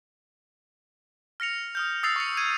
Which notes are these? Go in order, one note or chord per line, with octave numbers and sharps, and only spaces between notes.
F6 A#6 C#7 F7
D#6 F6 G6
D#6 E6 A6 C7 C#7 F7
C#6 C#7
G#6 D#7